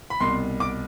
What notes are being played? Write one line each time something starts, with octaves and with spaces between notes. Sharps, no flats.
B5
C2 B2 C6
D6